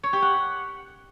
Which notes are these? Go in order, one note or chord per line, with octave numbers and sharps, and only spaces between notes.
C#5
G4
F#5